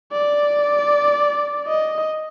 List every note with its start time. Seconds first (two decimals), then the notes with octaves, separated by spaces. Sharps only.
0.13 D5
1.68 D#5